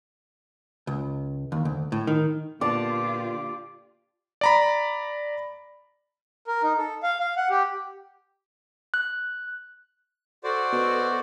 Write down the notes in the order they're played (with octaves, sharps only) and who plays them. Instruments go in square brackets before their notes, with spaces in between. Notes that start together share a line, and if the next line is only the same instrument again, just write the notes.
[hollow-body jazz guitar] C#2
D#2
D2
A2
D#3
[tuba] A#2 [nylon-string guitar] D3 B3 [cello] F4 G4 [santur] D5 A5
[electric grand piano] D5 A#5 B5
[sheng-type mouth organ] A#4
D#4
A4
F5
F5
F#5
G4
[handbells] F#6
[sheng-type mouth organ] F#4 C5 D5 [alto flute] A4
[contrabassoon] B2